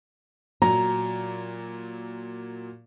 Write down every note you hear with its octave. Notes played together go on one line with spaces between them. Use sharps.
A#2 F#3 A#5